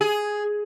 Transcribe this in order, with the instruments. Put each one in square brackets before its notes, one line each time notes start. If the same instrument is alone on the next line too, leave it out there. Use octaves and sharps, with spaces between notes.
[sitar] G#4